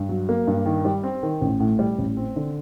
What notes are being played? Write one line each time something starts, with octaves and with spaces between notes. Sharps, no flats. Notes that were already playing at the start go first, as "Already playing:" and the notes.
Already playing: G2
F#3
A#3
G2
D#3
G3
C4
D#3
A1
A2
G3
A1
C4
D3